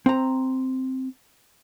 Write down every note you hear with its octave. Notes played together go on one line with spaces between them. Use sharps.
C4 A#5